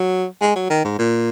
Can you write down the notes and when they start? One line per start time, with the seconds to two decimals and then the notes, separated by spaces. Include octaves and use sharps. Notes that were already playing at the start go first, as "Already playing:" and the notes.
Already playing: F#3
0.41 G#3
0.56 F#3
0.70 D#3
0.84 G#2
0.99 A#2